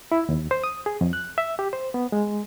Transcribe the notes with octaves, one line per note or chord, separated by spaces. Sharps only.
E4
D#2
C5
D#6
G#4
F2
F#6
E5
G4
C5
B3
G#3